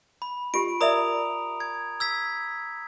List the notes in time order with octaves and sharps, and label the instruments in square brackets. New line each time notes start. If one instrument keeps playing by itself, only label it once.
[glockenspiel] B5
[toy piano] F4 G4 [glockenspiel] D7
[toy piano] A#4 D5 E5 [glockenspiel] A#5 D#6 F7
[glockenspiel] G#6
E6 G#6 B6